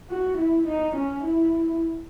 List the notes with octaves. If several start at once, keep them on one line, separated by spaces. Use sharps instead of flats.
F#4
E4
D#4
C#4
E4